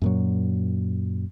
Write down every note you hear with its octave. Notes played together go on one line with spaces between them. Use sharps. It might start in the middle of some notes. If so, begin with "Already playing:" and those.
F#2 A#2 F#3